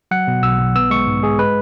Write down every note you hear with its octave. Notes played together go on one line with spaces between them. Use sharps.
F#3 F#5
B2
B1 E6
B1
B3 E6
G#3 C#6
G#2
G#3 G#4
G#3 B4